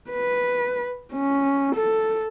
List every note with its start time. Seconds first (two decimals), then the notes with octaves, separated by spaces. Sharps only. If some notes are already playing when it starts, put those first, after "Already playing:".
0.11 B4
1.14 C#4
1.75 A4